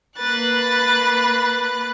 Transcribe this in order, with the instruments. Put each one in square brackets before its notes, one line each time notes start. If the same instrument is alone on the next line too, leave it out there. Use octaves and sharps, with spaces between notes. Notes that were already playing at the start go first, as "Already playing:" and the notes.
[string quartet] A#3 B4 F#6 A6